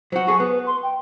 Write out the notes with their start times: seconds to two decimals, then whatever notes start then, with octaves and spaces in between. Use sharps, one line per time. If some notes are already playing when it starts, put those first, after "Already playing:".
0.12 F#3 F#4 C5
0.27 F#4 G#4 A4 C#6
0.40 B3 B4
0.67 C6
0.83 G5